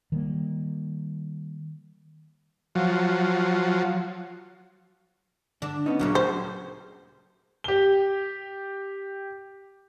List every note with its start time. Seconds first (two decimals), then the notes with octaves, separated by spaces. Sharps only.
0.12 D#3 G3 G#3 A#3
2.75 F3 F#3
5.62 D3 D4
5.86 B3 C#4 D#4
5.99 D2 A#2 C#3 F#3 F#4 A#4
6.15 C5
7.64 G4 G7